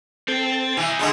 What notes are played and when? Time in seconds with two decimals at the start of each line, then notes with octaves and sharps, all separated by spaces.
0.28 C4 A4 C5 G5 A6
0.77 B2 E3 D#4
0.99 D3 G#3 B3 A5